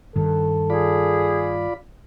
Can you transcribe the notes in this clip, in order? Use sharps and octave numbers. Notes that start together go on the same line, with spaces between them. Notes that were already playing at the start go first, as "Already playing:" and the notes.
G2 D#3 A4
F4 G#4 D5 B5